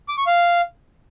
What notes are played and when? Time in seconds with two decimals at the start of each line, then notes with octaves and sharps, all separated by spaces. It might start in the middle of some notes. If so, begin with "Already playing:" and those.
0.08 D6
0.18 C#6
0.27 F5